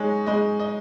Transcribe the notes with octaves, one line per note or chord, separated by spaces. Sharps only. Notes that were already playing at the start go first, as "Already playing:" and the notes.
Already playing: G#3 D#4 C#5
G#3 D#5
D#5